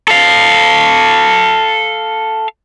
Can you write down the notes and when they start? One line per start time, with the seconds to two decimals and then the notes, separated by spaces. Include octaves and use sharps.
0.08 A4 F5